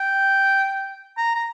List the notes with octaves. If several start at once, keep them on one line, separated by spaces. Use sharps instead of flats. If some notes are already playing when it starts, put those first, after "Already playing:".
Already playing: G5
A#5
A#5